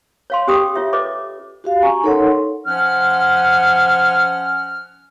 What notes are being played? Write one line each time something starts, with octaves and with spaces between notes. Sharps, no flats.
C#5 F5 C6
C#4 G4 G#4 G5 D#6
F4 C#5 E5
A4 B4 C#5 D#5 D6
F#4 G4 F5
C#4 G#5 A#5 C#6
D#4 A4 A#4 C#5 F#5 C6
F3 C#4 F#5 F6